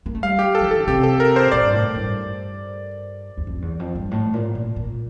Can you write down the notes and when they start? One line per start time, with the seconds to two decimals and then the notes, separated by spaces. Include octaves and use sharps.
0.06 A#3
0.15 A3
0.23 G3 F5
0.39 G4
0.55 A4
0.61 F3
0.66 E3 A4
0.79 D3
0.87 C3 G4
1.03 A4
1.20 A#4
1.36 C5
1.52 A#2 D5
1.64 G2
1.73 A2
1.95 G2
3.37 E2
3.47 F2
3.62 E2
3.79 F2
3.95 G2
4.11 A2
4.33 A#2
4.55 A#2
4.76 A#2